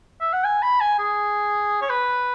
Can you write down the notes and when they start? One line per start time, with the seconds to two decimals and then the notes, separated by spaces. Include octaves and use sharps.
0.21 E5
0.33 F#5
0.45 G#5
0.63 B5
0.81 G#5
0.99 G#4
1.82 C#5
1.89 B4